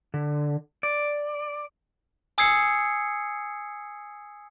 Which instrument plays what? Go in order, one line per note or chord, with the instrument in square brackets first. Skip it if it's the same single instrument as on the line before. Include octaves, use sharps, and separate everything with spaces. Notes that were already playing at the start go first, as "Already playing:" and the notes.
[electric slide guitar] D3
D5
[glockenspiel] G#5 D#6 E6 G#6 C7 C#7